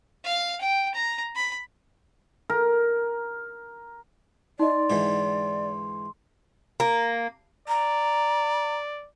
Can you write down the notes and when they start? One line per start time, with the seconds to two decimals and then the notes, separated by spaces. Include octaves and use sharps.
0.24 F5
0.61 G5
0.94 A#5
1.36 B5
2.50 A#4
4.59 D#4 D5 D#5 C6
4.90 G#2 D3 E3
6.80 A#3
7.68 D5 A#5